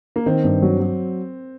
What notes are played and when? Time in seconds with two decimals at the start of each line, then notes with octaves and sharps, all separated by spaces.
0.16 A#3
0.26 D#3 C4
0.44 G2
0.62 F#3
0.80 F#3